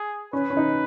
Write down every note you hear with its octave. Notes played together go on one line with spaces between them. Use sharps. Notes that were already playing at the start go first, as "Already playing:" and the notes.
Already playing: G#4
C#4 B4
C#4
D#4